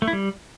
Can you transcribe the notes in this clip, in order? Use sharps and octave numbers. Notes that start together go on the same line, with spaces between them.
A3
E4
G3